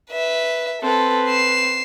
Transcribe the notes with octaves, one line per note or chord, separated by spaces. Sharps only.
B4 E5
C4 A4 B4
C7 E7